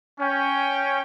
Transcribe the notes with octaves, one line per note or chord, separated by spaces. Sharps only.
C#4 G5